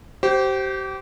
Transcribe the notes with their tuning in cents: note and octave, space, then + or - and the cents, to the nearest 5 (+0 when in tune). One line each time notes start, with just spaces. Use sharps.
G4 -30 C5 +0